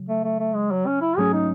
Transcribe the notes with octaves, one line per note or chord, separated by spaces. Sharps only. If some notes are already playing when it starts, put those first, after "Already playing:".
Already playing: C#3 F#3
A3
A3
A3
G#3
F#3
C#4
E4
G#2 F#3 A3 C#4 G#4
D#4